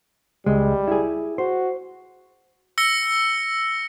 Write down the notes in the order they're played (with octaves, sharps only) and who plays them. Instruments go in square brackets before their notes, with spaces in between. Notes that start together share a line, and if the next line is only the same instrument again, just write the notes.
[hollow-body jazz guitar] C#2 G#3 [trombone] G3
[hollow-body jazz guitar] E4 G#4
[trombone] F#4 [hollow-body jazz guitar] C5
[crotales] E6 A#6 C#7 G7